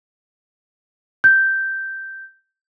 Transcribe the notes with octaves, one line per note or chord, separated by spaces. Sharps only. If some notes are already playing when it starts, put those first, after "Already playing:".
G6